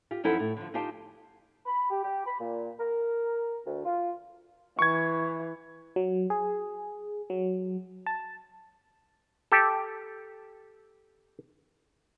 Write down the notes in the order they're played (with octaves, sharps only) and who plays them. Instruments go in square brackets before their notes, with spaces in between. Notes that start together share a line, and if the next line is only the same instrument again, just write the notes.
[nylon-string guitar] F4 G4
F#2 F3 D#4 E4 A4 F#5
A2
D3 F3
D#4 F4 G4 F5 G5 A5
[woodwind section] B5
G4
G4
B5
A#2
A#4
D2
F4
[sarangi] E3 [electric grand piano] C#6 G#6
[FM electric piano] F#3
G#4
F#3
A5
[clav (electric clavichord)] G4 A4